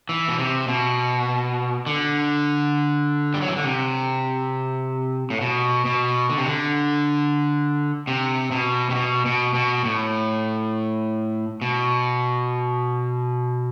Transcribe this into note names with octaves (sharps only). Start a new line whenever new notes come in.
E3
B2
C3
B2
D3
G3
F#3
E3
D3
C3
A2
B2
B2
D3
C3
D3
C3
B2
C3
B2
B2
B2
A2
B2